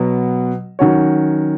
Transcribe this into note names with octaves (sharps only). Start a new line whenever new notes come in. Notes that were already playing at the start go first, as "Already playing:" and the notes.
Already playing: B2 F#3 B3
D#3 F#3 C#4 F#4 C#5